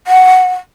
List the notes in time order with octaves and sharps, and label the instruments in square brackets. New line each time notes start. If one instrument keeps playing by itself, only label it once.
[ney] F#5